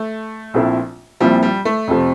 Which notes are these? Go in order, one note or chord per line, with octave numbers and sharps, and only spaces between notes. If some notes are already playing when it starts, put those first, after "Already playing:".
Already playing: A3
A#1 A#2 F3 C4 E4
A#1 A#2 F3 G3 C4 E4
G3
A3
F2 C3 F3